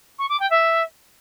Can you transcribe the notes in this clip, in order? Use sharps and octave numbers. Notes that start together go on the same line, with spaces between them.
C#6
D6
G5
E5